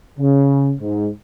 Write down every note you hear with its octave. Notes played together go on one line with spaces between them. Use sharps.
C#3
G#2